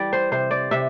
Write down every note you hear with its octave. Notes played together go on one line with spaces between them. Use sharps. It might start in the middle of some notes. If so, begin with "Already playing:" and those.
Already playing: E3 G3 D5
C5
C3 C5
D5
C3 E5